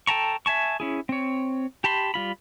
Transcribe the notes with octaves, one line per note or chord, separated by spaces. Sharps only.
A4 G5 A5 A#5 C#6
E5 G#5 A5 C#6
C#4 E4 G#4
C4 C#5
G4 A5 B5 C6
G3 F4 B5